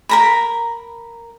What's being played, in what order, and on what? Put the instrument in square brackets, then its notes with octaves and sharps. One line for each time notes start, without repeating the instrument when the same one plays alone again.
[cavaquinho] A#4 A#5 B5